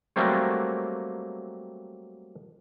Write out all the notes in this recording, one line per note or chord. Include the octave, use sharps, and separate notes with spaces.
F#3 G3 A3 A#3 C4 C#5